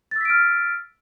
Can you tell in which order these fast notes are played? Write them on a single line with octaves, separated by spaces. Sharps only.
A6 E6 B6 D7 F6